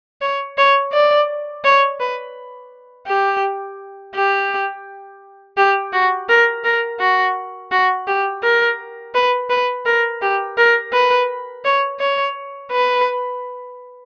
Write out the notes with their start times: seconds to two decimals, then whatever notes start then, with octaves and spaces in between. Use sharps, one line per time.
0.21 C#5
0.58 C#5
0.93 D5
1.64 C#5
2.00 B4
3.08 G4
4.15 G4
5.57 G4
5.93 F#4
6.29 A#4
6.65 A#4
7.00 F#4
7.71 F#4
8.07 G4
8.43 A#4
9.15 B4
9.50 B4
9.86 A#4
10.22 G4
10.58 A#4
10.93 B4
11.65 C#5
12.00 C#5
12.72 B4